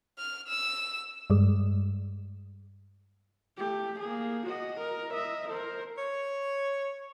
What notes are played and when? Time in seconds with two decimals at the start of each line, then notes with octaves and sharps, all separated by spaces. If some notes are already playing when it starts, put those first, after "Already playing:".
0.18 F6
0.48 E6
1.30 G2 G3 G#3
3.58 A3 G4
4.00 A#3 G#4
4.47 F#4 D#5
4.80 A#4
5.14 D#5 E5
5.49 A#4 C5
5.97 C#5